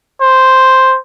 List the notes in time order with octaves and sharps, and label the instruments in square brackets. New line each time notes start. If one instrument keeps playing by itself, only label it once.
[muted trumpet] C5